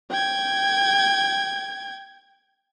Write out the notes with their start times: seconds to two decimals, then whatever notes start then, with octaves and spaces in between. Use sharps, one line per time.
0.10 G5 G#6